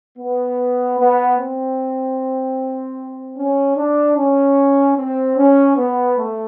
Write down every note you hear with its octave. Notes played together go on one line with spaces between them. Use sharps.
B3
B3
C4
C#4
D4
C#4
C4
C#4
B3
A3